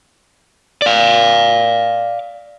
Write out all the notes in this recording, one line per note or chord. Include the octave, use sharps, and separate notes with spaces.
D5 F5